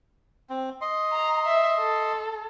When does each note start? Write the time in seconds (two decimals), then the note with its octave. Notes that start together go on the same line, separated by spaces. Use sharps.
0.50 C4
0.81 D#5 C6
1.13 A#5
1.46 E5
1.79 A4